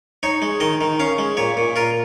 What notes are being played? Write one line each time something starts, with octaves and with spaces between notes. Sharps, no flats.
D#4 C#5
G#3
D#3 D#5
D#3
C#4 F5
G#3
A#2 C#5
A#2
F4 A#4